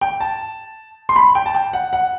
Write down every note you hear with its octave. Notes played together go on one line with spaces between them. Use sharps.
G5
A5
C6
B5
G5
A5
G5
F#5
F#5